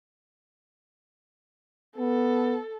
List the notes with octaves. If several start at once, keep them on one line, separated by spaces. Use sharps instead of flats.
B3 A4